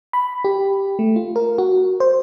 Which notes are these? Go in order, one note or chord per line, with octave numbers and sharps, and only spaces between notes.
B5
G4
A3
F4
A#4
F#4
C5